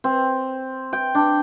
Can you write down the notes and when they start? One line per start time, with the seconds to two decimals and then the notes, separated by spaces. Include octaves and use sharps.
0.04 C4
0.93 G5
1.15 D4